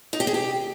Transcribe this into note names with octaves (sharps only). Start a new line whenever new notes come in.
D#4
G4
G#4
G4